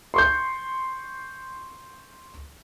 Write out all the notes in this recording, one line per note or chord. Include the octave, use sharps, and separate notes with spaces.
C6 C#6 G6